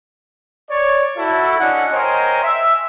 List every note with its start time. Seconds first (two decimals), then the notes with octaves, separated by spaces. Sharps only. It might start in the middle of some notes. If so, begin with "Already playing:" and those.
0.70 C#5 D5
1.17 E4 F#4 A4
1.60 C#4 D4 D#5 F#5
1.92 A#4 C5 C#5 D#5 G5 G#5
2.43 E5